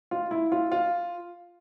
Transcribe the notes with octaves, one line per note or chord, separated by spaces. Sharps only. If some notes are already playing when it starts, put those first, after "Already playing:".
F4
E4
F4
F4